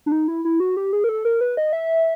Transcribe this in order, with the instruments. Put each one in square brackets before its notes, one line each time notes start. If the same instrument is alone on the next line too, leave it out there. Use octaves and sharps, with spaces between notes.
[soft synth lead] D4
D#4
E4
E4
F#4
G4
G#4
A#4
A4
A#4
B4
D#5
E5